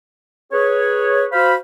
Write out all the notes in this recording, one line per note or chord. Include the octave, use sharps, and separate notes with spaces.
G#4 B4 C#5
F#4 C5 F5 B5